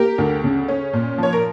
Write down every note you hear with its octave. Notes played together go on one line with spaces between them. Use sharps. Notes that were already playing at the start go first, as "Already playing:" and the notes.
Already playing: A#3 G4 A#4
D2
C#3
C#4
A#2
F3 C#5
A#4